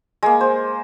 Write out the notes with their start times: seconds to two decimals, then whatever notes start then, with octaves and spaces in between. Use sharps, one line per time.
0.23 G#3 A#3
0.41 C5